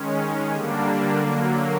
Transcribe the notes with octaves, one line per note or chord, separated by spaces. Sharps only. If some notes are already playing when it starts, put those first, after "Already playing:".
Already playing: D#3 G#3 C#4
D3 G3 A#3 D4
D3 F#3 A#3